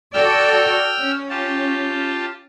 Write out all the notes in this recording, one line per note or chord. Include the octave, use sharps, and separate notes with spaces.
F#4 A4 D5 G5 E6 F6
C#4
F4 G4 A5